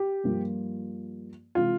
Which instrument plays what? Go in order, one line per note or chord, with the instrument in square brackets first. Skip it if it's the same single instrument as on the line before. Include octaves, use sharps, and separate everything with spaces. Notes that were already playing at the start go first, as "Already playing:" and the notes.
Already playing: [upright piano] G4
[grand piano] G2 F3 A#3 F4
[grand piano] C3 E3 G#3 C4 [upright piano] F4